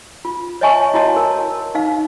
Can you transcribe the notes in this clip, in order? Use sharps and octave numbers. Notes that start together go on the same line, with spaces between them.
F4
C#5 D#5 E5 G#5 A5 C#6
E4 F#4 C#5 D#5 F5 A5
A#4 A5
D#4 F5